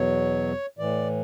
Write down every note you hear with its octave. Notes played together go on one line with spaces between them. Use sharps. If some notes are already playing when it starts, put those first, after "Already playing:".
Already playing: E2 B2 F#3 C#5
A2 E3 D5